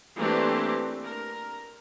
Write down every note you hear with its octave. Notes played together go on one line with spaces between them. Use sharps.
E3 A3 A#3 C4 D4 G4
A#4